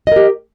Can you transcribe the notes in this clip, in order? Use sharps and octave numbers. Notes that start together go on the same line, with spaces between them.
G4 A#4 D#5